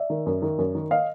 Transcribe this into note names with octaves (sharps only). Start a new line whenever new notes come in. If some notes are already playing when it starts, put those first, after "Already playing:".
Already playing: D5 E5
D#3
F#2
D#3
F#2
D#3
D#5 F5